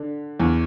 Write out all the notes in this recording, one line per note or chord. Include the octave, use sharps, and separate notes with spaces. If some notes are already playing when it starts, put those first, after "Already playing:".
Already playing: D3 D4
E2 E3